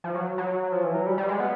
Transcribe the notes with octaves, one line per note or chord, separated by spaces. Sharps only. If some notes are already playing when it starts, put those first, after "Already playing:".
F3
F#3
F#3
F3
E3
F#3
G3
G3
G#3
B3